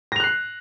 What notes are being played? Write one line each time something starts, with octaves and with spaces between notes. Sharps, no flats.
F#6 A#6 C7 F7